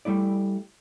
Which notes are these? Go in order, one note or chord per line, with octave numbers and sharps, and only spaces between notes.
G3 A3 E4 D5